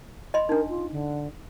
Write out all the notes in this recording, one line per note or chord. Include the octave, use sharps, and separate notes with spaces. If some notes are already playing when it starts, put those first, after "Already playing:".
D#5 B5 C6
D4 D#4 A#4
F4
D3